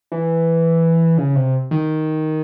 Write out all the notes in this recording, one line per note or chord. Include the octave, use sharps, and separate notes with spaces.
E3
C#3
C3
D#3